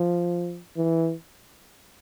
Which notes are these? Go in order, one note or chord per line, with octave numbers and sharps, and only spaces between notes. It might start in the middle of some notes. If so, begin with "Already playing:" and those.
Already playing: F3
E3